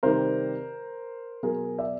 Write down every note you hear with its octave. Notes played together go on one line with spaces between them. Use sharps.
C3 D#3 G3 A#4 C5
B2 F#3 G#4 A#4
D5 E5